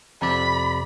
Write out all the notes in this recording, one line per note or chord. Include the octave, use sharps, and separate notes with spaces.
F2 C3 D5 B5